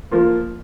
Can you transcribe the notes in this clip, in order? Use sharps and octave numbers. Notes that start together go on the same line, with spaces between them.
F3 A#3 F4